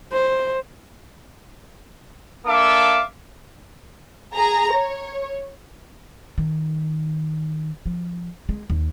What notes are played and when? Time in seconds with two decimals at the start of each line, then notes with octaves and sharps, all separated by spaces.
0.13 C5
2.46 A#3 D4 A4 E5 F5 D6
4.34 G#4 A#5
4.72 C#5
6.38 D#3
7.86 F3
8.49 G#3
8.70 D#2